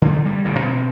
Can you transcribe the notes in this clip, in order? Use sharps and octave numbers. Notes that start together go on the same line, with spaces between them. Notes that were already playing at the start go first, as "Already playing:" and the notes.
D3 A3
G2 G3
A1 G2 B2 D3
B2 C4